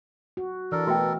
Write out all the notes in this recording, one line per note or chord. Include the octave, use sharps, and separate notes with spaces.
F#4
E3 D4 A4 A#4
B2 A3 F#4 E5 G5